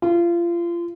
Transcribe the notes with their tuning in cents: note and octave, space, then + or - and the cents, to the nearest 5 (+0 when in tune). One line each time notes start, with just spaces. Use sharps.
F4 -30